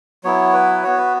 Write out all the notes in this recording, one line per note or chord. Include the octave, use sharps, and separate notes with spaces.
F#3 B3 E4 C#5
B4
B3 F#4 C#5
B4